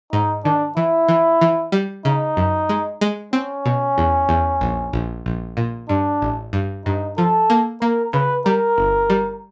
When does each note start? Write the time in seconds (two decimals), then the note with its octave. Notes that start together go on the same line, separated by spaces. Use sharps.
0.13 G#2 D#4
0.45 D#3 D4
0.77 E3 E4
1.08 E3
1.41 E3
1.72 G3
2.05 C#3 D#4
2.37 F#2
2.69 G#3
3.01 G#3
3.33 C4 C#4
3.66 B2
3.98 E2
4.29 E2
4.61 A#1
4.93 A#1
5.26 A#1
5.57 A#2
5.89 G2 D4
6.22 A1
6.53 G2
6.86 G2 D#4
7.18 F3 A4
7.50 A#3
7.82 A#3 A#4
8.13 C#3 B4
8.46 G3 A#4
8.78 G1
9.10 G3